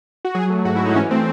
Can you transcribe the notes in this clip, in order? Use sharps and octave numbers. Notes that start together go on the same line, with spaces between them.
F#4
F#3 G#4
A3
G#2 F#4
E4
G#2
D#4
E3 C#4
A3 C4